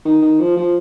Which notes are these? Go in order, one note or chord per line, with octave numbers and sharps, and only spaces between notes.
D#3
D#3
F3
F3